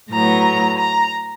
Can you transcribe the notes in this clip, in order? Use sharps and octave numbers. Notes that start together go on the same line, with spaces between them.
A2 F#3 B3 A#5
A#5